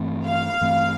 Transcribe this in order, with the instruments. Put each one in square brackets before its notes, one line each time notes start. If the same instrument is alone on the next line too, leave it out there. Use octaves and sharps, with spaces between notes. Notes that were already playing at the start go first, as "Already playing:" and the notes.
Already playing: [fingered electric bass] G2 E3 A3 C4
[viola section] F5
[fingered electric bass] G2 E3 A3 C4